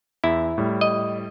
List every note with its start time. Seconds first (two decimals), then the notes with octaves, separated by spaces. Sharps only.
0.24 E2 E4
0.58 A2 G3
0.81 D#5